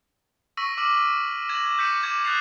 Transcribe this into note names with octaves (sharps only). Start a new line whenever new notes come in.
C#6 E6 A#6 B6 D#7
D6 E6 F6 B6 D#7 F#7
G#6 A#6 E7 F#7
E6 G6 B6 C#7 D#7 E7
D6 G#6
D#6 F#6 G#6 A6 C7 F7